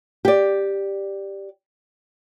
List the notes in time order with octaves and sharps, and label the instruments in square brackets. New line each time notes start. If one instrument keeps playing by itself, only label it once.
[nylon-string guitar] G4 D5